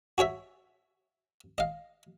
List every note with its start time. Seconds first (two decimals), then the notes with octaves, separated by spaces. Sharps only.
0.18 F#4 G#4 C#5 E5
1.58 D#5 F5